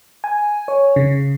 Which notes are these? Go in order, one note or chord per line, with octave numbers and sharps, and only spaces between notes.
G#5
C#5
C#3